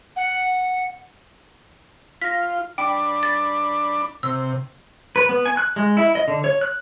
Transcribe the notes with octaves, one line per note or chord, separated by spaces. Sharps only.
F#5
F4 A#6 B6
D4 G5 B5 D6
A6
C3 E6
B4
B3
G#5
F#6
G#3
E4
D#5
D3
C#5
F#6